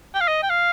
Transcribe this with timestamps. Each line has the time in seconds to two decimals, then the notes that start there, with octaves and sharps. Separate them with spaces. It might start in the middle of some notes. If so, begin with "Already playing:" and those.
0.15 G5
0.21 F5
0.28 D#5
0.43 G5
0.50 F5